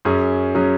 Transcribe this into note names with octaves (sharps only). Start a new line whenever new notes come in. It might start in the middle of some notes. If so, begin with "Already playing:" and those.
F#2 F#3 C#4 G#4
F#3 C#4 G#4